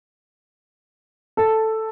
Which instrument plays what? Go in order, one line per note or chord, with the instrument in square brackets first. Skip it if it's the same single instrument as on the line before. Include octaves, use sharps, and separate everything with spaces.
[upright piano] A4